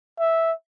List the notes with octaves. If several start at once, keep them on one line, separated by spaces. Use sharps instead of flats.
E5